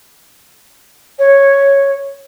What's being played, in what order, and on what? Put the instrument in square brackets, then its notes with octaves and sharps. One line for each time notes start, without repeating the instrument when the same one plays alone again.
[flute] C#5